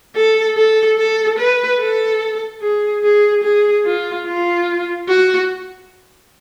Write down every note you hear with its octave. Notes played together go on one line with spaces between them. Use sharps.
A4
A4
A4
B4
A4
G#4
G#4
G#4
F4
F4
F#4